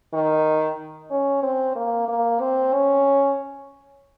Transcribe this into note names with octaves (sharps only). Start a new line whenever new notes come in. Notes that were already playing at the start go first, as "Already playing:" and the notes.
D#3
C#4
C4
A#3
A#3
C4
C#4